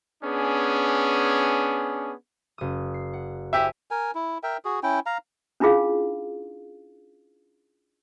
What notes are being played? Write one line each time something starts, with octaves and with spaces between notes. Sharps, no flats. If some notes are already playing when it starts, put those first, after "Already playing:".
B3 C#4 D4 G#4
F#1 D#6
C7
F#5
E4 G4 C5 E5 G#5
A#4 G#5
E4
A#4 E5 G5
F#4 G#4
C#4 E4 G5
F5 A#5
C#4 D4 E4 F4 G#4 F5